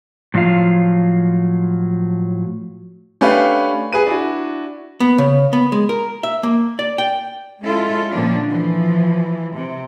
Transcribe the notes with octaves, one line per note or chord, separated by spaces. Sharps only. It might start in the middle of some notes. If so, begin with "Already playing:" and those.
A2 F3 F#3 F4 F5
A3 C#4 D4 G4 B4 F5
G#4 B4 D#7
D4 E4 F#4
B3
C#3
B3
G#3
A#4
E5
A#3
D5
G5
G#3 C#4 E4 F4 A4
A#2 D3 F3 C#4 D4
E3 F3
C3